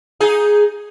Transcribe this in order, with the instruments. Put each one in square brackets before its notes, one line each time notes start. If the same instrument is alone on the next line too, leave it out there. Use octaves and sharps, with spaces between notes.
[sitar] D#4 G#4